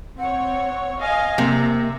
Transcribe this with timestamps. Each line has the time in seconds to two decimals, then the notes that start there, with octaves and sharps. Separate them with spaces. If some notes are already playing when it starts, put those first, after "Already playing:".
0.18 C4 C#5 F#5
1.01 D#5 F5 G#5 A#6
1.38 C3 A#3 E5